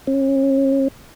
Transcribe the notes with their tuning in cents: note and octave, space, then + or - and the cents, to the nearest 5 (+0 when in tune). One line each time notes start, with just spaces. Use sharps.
C#4 -35